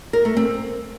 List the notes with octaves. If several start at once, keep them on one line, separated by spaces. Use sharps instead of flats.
A#4
A3
C4